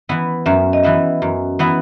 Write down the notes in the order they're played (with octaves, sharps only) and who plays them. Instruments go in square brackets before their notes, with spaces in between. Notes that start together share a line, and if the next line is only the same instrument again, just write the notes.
[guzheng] E3 B3 E4
[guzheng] F#2 [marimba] E5
[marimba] D#5
[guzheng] E3 B3 E4 [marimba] E5
[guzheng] F#2
E3 B3 E4